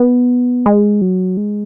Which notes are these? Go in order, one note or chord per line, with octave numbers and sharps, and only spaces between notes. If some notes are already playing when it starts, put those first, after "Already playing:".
Already playing: B3
G#3
F#3
G#3